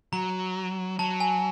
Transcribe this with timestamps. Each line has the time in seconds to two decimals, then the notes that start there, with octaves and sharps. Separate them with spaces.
0.13 F#3 A#5
0.99 F#3 A5
1.20 G#5